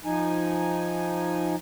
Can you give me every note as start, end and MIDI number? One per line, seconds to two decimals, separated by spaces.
0.05 1.55 53
0.05 1.55 63
0.05 1.55 80